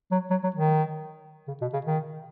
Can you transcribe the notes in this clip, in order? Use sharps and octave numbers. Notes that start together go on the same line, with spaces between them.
F#3
F#3
F#3
D#3
C#3
B2
C#3
D#3